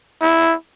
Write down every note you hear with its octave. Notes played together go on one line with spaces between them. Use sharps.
E4